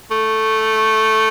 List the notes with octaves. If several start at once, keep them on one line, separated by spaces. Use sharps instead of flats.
A3